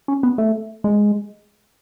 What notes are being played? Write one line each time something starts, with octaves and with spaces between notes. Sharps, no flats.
C#4
B3
A3
G#3